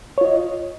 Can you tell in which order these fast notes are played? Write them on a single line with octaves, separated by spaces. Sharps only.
C#5 F4 D#5